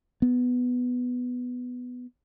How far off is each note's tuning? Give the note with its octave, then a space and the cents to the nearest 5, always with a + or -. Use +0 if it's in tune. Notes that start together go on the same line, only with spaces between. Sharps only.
B3 +5